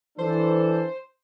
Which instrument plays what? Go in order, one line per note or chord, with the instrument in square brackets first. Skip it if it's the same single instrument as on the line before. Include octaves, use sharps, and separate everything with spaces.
[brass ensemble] E3 D4 A4 [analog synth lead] C5